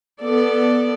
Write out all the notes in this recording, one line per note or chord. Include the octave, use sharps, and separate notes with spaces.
B3 A4 D5